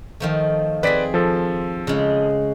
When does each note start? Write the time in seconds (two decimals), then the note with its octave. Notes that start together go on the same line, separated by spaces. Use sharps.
0.20 D#3 F3 A3
0.83 C4 G#4 B4 D5 B6
1.14 F3 A4
1.87 C#3 G#3